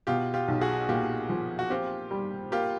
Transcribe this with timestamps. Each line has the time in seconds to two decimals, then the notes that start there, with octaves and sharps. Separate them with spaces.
0.07 B2 F4 G4
0.34 F4 G4
0.48 B1
0.61 F#4 G#4
0.89 A#2 F4 G4
1.29 F3
1.59 F#4
1.70 C4 F4 G4
2.11 G3
2.52 A#3 F4 G4